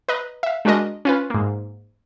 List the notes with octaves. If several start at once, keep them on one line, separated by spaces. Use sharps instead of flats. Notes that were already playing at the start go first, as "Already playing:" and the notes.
B4 D#5 A#5
E5 F5
G#3 D4 F#4 A#4 D#5
C#4 F4 B4
G#2 A#3